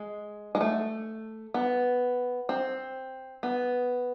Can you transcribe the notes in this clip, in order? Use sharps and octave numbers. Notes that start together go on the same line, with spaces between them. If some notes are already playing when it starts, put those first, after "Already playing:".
Already playing: G#3
G#3
A3
B3
C4
B3